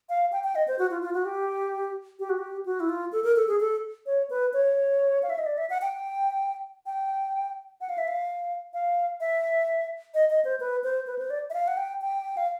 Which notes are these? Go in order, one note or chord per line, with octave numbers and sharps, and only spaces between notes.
F5
G5
G5
D#5
C5
F#4
F4
F4
F#4
G4
G4
F#4
G4
F#4
E4
F4
A4
A#4
A4
G#4
A4
C#5
B4
C#5
F5
E5
D#5
D5
E5
F#5
G5
G5
F#5
F5
E5
F5
F5
E5
D#5
D#5
C5
B4
C5
B4
C5
D5
E5
F5
F#5
G5
G5
F5